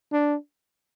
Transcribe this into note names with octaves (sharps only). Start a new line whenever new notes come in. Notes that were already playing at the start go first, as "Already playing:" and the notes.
D4